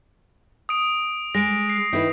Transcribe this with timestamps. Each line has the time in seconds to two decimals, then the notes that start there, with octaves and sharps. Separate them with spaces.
0.69 D#6 D7
1.35 G#3 A#6 D7
1.69 C7
1.93 D#3 E4 B4